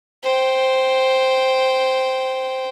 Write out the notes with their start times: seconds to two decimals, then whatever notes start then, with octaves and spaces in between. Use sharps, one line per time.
0.24 C5 G5